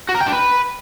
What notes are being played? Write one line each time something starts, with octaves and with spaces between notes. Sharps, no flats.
F#4
A#4
G5
D4
B4